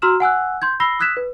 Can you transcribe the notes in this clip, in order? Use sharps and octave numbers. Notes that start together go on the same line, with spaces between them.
F#4 A#5 C6 E6 F6 E7
F#5 G#5 E6 F#6
C6 G6 G#6
B5 E6 A#6 C7 G7
D#6 E6 F#6 G#6 B6 E7
B4